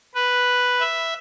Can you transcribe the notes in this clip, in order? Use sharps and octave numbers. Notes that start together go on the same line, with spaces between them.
B4
E5